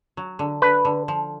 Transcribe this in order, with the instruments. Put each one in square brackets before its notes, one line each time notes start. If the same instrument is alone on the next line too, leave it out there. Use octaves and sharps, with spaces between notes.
[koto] F#3
D3
[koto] D3 [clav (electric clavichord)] B4
[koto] D3
F3